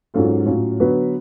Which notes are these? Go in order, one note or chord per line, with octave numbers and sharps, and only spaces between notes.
G#2 F#3 C#4 F4 A4
A2 F#3 C#4 F4
D3 F#3 B3 F#4 B4